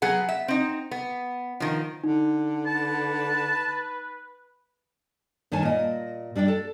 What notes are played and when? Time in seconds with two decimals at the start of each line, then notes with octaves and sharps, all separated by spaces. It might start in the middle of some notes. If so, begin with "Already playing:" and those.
0.02 F#3 B3 G#4 F#5
0.29 E5
0.48 C4 D#4
0.91 B3
1.60 D#3 F3
2.04 D3 D#4
2.66 B4 A5
5.52 G2 D#3 C#5 G#5 A5
5.63 A#2 D#5
6.36 G3 D4 D5 G5
6.48 A4